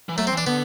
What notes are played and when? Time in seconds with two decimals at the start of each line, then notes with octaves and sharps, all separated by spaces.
0.09 E3
0.17 F#3 A3
0.27 C4
0.33 E3 D4
0.46 D3 B3